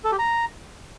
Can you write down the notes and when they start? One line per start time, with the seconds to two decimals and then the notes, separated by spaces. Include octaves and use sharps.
0.05 A4
0.12 G4
0.19 A#5